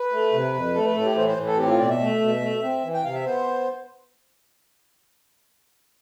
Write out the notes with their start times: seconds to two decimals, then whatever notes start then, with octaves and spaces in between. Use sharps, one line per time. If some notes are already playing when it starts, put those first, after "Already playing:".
Already playing: B4
0.12 A3
0.33 C3
0.54 F2
0.75 A3 A4
0.85 B4
0.95 A2 A4
1.05 G4
1.16 E3 C5
1.27 C5
1.37 A2
1.47 A4
1.58 C4 G4
1.68 F4
1.79 B2 D5
1.90 E5
2.00 A3
2.21 B2
2.41 A3
2.63 C4
2.83 E3
2.94 G5
3.04 C3 F5
3.14 E5
3.25 B3 C5